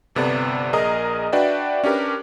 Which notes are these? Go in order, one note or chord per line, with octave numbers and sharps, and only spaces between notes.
G1 C3 B3 A4 D5
A#1 G#4 A#4 D#5 A#5 D#6
D4 F#4 B4 D5 E5 G5
C#4 D4 G4 A#4 B4